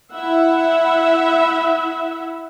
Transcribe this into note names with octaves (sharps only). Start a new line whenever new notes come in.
E4 E5 F#5